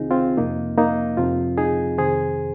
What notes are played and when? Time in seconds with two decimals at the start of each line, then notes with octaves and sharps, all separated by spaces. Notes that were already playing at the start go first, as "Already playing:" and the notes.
Already playing: C2 C3 D#3 C4 D#4 F4 G#4
0.11 C4 F4
0.37 F2 C3 F3 A#3 D#4
0.78 A#3 D#4
1.17 F2 C3 F3 C4 F4
1.58 D#4 G#4
1.98 F2 C3 D#3 G#4 C5